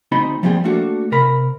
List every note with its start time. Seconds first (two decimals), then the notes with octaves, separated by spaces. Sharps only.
0.12 D2 C4 D#4 D#5 B5 C6
0.43 F3 G3 A#3 C4 G#4 G5
0.64 A3 A#3 D4 F#4 G4 A4
1.12 C3 A#4 B5